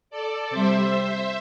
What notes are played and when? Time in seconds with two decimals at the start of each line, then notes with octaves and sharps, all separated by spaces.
0.10 A4 D5
0.51 C3 G3 C5 E5